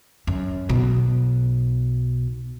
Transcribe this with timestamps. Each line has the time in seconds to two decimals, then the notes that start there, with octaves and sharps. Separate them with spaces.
0.27 F#2
0.69 B1 B2